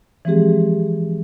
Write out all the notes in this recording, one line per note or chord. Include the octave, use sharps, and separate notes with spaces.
E3 F3 G#3 C4 G4 G#4